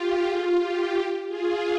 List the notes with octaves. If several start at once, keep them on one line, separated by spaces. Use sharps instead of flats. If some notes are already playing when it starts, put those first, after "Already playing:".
Already playing: F4 G4
F4 G#4
G4
G4
F4 G#4